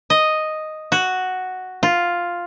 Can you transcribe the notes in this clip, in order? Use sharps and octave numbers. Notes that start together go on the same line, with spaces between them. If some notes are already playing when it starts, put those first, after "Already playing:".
D#5
F#4
F4